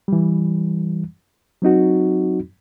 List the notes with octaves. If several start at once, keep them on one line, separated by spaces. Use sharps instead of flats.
E3 G3
F#3 C4 D#4 F#4